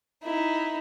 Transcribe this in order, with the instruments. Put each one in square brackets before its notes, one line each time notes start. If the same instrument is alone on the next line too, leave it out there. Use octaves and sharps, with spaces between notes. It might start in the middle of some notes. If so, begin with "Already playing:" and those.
[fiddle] D#4 E4